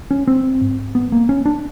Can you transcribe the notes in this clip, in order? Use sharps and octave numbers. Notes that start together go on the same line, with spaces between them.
C#4
C4
G#2
B3
A#3
C#4
D4